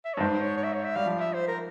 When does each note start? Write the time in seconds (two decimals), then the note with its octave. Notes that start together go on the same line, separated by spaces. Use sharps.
0.05 E5
0.14 C#5
0.17 G2
0.20 G#2 C5
0.42 C#5
0.57 C#5
0.64 E5
0.74 C#5
0.85 E5
0.96 G3 F5
1.06 F3
1.20 E5
1.34 C5
1.48 A#4